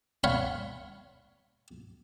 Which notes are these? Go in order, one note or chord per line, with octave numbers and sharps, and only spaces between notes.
C#5 F5 F#5 B5 C#6